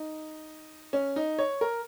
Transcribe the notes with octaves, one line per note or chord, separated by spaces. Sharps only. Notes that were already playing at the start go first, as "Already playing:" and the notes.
Already playing: D#4
C#4
D#4
C#5
A#4